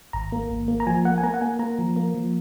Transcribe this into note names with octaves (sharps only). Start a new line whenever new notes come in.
G#1 A#5
A#3
G#1
A#3
A#5
F3 G#5
A#3 F#5
G#5
A#3 A#5
F#5
A#3 G#5
A#3 A#5
F3
A#3
F3